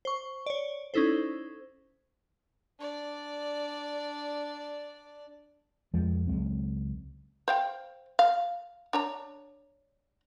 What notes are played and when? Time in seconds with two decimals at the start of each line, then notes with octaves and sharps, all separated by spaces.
0.05 C5 C#6
0.46 C#5 D5
0.94 C#4 D#4 E4 A4 C5
2.79 D4 D5
5.94 F2 F3 G#3
6.27 C#2 F#3 G#3 C4
7.48 C5 F5 G5
8.19 F5
8.93 D4 C#5 A#5